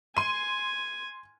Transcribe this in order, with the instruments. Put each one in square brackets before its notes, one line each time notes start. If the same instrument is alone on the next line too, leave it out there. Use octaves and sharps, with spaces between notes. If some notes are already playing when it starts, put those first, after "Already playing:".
[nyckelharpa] G#5 [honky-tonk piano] C6 D#7